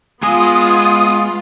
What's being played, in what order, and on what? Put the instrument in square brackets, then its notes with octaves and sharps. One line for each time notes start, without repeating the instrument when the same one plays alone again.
[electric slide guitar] G#3 G#5 [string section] B3 F4 [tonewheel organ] D#6